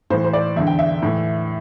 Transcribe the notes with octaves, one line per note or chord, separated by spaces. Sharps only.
A2 E3 C5
C5
D5
E2 D3 E5
G5
E5
A2 E3